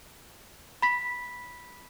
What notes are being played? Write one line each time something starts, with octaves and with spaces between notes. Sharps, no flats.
B5 B6